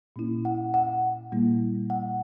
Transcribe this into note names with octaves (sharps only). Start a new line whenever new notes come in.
A#2 A#3 C#4 E4
F#5
F#5
A#2 G3 A#3 E4
F#5